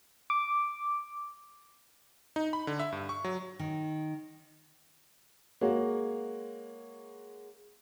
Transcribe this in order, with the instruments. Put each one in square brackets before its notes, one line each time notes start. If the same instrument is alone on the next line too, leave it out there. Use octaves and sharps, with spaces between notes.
[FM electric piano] D6
[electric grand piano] D#4
B5
D3
E5
G2
C#6
F#3
[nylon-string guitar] D#3
[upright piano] G#3 A#3 F#4 C#5